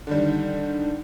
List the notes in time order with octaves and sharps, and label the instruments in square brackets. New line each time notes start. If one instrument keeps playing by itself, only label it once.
[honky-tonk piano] D3 D#3 G3